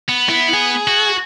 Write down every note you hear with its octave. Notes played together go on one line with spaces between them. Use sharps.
B3
E4
G#4
F#4